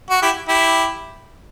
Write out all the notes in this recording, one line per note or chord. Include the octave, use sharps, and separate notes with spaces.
F#4
E4 G4
E4 G4